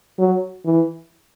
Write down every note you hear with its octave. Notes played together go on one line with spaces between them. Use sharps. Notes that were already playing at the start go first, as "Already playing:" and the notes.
F#3
E3